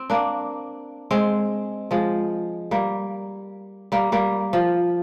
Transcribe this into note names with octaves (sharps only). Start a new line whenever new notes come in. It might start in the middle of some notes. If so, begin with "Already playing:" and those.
Already playing: C4
A#3 D4
G#3 C4
F3 G#3
G3 A#3
G3 A#3
G3 A#3
F3